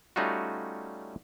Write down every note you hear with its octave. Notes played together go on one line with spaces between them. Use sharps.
G3 A3 C#4 D#4 F4 F#4